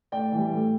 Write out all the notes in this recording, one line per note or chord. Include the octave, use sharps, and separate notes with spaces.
A2 D5 G5
E3
G3
A2